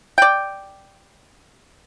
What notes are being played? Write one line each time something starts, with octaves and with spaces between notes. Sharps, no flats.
D5 G5